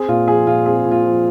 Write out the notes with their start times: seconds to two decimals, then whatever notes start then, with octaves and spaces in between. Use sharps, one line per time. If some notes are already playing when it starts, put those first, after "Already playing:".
Already playing: C4 G#4
0.08 A#2 F4
0.28 F3 G#4
0.47 A#2 F4
0.66 C4 G#4
0.85 A#2
0.91 F4
1.04 F3